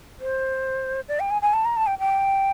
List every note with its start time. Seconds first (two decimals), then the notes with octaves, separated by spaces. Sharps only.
0.20 C5
1.09 D5
1.20 G5
1.31 G#5
1.42 G#5
1.53 A5
1.65 A#5
1.77 A5
1.87 G5
1.99 G5